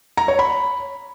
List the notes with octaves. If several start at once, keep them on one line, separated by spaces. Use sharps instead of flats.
A#5
C#5
B5